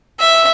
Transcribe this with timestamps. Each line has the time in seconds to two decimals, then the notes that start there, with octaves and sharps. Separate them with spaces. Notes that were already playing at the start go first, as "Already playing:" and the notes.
0.20 E5